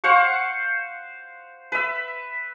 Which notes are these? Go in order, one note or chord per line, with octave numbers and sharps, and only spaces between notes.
C5 F5 F#5 C#6
B4 E5